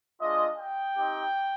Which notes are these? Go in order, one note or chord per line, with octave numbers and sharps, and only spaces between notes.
G#3 D4 F4 D#5
G5
C4 D#4 G4